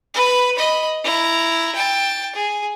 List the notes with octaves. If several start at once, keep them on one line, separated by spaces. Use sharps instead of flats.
B4 B5
D#5 B5
E4 A#5
G5 A5
G#4